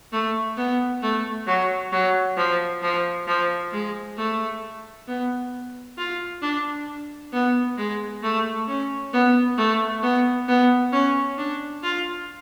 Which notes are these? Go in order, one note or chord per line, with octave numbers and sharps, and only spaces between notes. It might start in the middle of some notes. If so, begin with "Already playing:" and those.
A3
B3
A3
F#3
F#3
F3
F3
F3
G#3
A3
B3
F4
D4
B3
G#3
A3
C#4
B3
A3
B3
B3
C#4
D4
F4